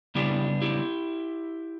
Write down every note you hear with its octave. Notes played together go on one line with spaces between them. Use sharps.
C#3 G3 B3 D4 E4 G4
E4 G4